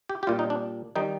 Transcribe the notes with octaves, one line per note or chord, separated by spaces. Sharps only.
G4
G4
A#2 G3 F4
D#4
D4
D#3 G3 D#4